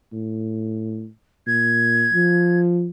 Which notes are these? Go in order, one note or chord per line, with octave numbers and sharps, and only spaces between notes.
A2
A#2 G#6
F3